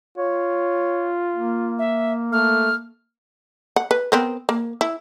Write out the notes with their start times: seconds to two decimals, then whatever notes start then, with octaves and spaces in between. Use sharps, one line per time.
0.18 F4 C#5
1.36 A#3
1.79 E5
2.32 A3 F6
3.76 F#5
3.91 B4
4.12 B3 C4 A#4
4.49 A#3
4.81 E4